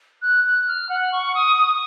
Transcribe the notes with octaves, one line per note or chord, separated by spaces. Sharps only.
F#6
F#6
F6
F#5
C#6
D#6
D#6